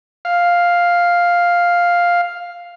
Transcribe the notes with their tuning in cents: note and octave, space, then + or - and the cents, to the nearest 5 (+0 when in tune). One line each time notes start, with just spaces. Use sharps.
F5 +5